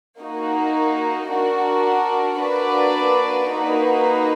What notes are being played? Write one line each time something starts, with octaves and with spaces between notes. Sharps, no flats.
A#3 D#4 F#4
D4 F#4 A#4
A#3 D4 F#4 B4 D5
A#3 D#4 F#4 B4